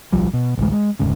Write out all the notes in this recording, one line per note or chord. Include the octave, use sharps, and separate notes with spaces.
D1 B1 F3 G3
B2
A1 D2 G#3
G#3
F1 D2 G#2 C#3